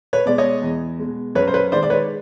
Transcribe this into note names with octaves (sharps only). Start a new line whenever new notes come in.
B4 C#5
B2 G#3 D5
C#5 D#5
E2
B2 G#3
F#2 B4 C#5
C5
B4 C#5
D#3 G#3 C5 D5
D5
B4 C#5